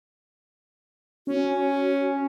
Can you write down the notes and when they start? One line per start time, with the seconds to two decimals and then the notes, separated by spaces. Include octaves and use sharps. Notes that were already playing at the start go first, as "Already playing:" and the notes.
1.27 C#4 F#4